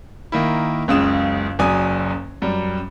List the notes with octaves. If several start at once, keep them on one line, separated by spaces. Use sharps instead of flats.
D#3 A#3 E4
F#1 C#2 C#3 D#6 E7
F#1 F#2 D5 G#5 D#6
F#2 G3